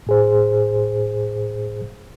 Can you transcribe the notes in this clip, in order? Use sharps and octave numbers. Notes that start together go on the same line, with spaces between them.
A2 G#4 C5